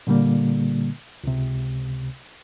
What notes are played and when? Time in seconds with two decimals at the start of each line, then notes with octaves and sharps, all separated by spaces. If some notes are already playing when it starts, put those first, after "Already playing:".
0.07 A#2 D3 G3 A#3
1.24 C#2 C3